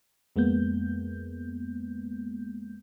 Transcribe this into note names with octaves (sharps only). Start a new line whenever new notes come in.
F2 G#3 A#3 B3 G6